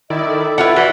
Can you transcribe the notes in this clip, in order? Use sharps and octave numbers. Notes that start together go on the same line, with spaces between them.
D#3 E4 D5 D#5
A4
E4 F4 B4 F#5
E3 F#4 D5